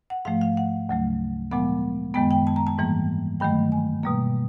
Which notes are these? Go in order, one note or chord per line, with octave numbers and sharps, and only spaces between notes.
F#5
G#2 F3 A3 F5
F5
F#5
D2 C#3 F#3 A3
A#2 F3 G#3 B3 F#5
F#2 D#3 G#3 B3 G5
G5
A5
A#5
A5
G#2 E3 G3 A#3
G2 D#3 F#3 A3 G5
G#5
B2 G3 A#3